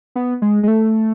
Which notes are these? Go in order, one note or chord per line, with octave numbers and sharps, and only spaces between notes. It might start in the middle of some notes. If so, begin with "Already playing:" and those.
B3
G#3
G#3
A3